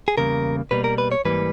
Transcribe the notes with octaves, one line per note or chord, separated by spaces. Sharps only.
G#4
E2 C#3 G3 A#3 A#4
B2 G3 A#3 B4
A#4
B4
C#5
G#2 E3 G3 A#3 B4